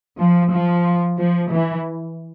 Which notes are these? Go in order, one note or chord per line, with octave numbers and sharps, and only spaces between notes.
F3
F3
F3
E3